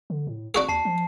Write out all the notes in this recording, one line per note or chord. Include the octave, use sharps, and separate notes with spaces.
D3
A2
G#1 D4 F#4 G#4
D#2 A5 C7
F3